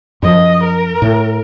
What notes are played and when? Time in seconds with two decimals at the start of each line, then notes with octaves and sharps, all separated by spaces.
0.22 F#2 F3 D#5
0.64 A#4
1.02 A2